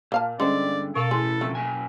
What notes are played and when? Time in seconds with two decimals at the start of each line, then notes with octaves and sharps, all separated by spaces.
0.12 A#2 A#3 F5 A5
0.40 G2 D3 G#3 C#4 G#4 C5 D5
0.95 B2 A4 A#4 F5 C#6
1.11 A2 E3 G#4 C6
1.41 F2 A#2 C#3 A3
1.55 F#2 A#3 G#5